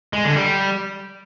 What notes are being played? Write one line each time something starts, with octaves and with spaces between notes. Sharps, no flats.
G#3
D3
G3